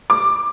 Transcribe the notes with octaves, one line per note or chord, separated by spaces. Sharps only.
D6